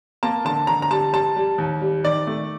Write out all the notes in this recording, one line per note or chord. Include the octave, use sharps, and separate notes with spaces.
A#3 A5
D3 A5
D3 A#5
A#5
G3 A5
G3 A5
G3
D#2
G3
D#3 D5
A3